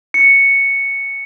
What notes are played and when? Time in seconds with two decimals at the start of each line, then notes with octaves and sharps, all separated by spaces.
0.14 C#7